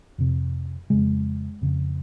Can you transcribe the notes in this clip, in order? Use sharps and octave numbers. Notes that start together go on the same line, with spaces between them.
F2 C3
F2 C#3 G#3
F2 C#3